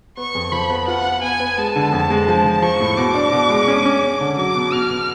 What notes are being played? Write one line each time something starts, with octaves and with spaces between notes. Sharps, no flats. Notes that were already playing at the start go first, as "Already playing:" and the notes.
B3 C#6
F2
F3 B5
B3
F4 F#5
B3
B3 G#5
B3
G#3 A5
D3
F2
G#3
F3
F3
F3 C#6
A2
B2 D6
D4
B2
G#3
C#4
C#4
C#4
D3
F#3 D6
B2
B2 F6
B2